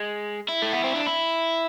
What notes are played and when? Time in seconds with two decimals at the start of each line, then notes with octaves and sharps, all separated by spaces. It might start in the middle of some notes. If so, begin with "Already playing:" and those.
Already playing: G#3
0.49 E4
0.62 A3
0.73 B3
0.84 C4
0.95 D4
1.07 E4